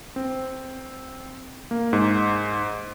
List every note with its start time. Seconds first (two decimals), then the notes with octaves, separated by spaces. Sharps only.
0.16 C4
1.71 A#3
1.93 G#2